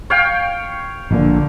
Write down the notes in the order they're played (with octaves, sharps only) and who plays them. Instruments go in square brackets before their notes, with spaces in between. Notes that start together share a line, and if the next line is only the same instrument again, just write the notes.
[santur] C#5 F5 G5
[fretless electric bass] A#1 A#2 [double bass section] D3